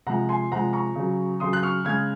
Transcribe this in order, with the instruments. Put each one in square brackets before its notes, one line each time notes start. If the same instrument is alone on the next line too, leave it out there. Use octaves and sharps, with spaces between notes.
[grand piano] C3 F3 G#3 F#5 A#5
G#5 C6
C3 F3 G#3 F#5 A#5
A#5 C#6
C#3 F#3
C#3 F#3 C6 D#6
F#6
C#6 F6
C#3 G#3 F6 G#6